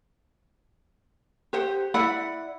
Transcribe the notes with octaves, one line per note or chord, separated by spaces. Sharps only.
G4 C5 F#5
E4 D5 F#5 B5